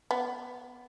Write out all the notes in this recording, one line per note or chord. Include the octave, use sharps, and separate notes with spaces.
B3